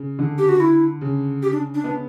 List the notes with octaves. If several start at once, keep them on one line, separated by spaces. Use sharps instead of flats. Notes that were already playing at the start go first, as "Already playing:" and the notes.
Already playing: C#3
D3
G4
F#4
E4
C#3
G4
D4
D4
B3